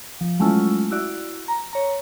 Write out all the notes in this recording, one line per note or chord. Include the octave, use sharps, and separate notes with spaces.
F3
F#3 G#3 A3 C#4 E4 F4
E4 F#4 D5
A#5
C#5 A#5